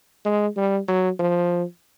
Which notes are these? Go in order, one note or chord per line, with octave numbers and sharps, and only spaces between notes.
G#3
G3
F#3
F3